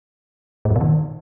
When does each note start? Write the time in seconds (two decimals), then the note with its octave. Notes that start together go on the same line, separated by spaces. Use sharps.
0.65 A2
0.70 F#2
0.76 B2
0.81 D#3